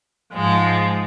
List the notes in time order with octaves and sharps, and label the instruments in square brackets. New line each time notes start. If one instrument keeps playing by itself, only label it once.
[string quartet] G#2 F3 G#3